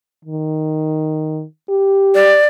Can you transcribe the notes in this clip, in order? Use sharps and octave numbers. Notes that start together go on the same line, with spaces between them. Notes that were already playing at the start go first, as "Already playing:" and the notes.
D#3
G4
D5